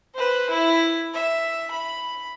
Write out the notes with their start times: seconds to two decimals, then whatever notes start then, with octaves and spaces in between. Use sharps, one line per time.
0.14 B4 C5
0.50 E4
1.14 E5
1.71 B5